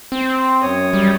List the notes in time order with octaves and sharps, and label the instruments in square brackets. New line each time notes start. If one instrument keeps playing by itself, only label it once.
[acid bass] C4
[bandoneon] F#2 C#5 D#6
[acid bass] G3